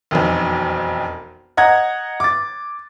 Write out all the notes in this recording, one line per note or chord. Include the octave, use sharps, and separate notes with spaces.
E1 B1 F2
D#5 F#5 A#5 G#6
D6 A6